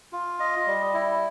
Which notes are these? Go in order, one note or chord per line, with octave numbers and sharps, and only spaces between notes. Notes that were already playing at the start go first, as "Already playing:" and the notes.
F4
D#5
G3
E4